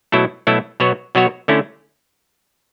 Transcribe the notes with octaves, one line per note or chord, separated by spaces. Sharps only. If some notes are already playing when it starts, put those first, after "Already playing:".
B2 F#3 A3 E4 A4
B2 F#3 A3 E4 A4
B2 F#3 B3 F#4 C#5
B2 F#3 B3 F#4 C#5
D3 A3 C#4 E4